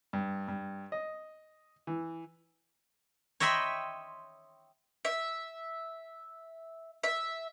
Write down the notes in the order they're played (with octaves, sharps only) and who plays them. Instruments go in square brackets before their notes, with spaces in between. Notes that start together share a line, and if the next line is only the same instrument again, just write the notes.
[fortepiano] G2
G2
D#5
E3
[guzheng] C#5 D#5 E5 G5 B5 C6
[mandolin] E5
E5